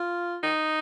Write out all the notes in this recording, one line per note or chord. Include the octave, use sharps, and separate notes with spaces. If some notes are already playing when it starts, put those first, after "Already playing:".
Already playing: F4
D#4